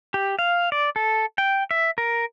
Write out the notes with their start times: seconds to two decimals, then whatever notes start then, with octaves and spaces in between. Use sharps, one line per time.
0.14 G4
0.39 F5
0.72 D5
0.96 A4
1.38 G5
1.71 E5
1.98 A#4